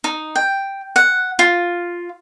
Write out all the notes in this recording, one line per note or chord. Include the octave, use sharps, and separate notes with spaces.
D#4
G5
F#5
F4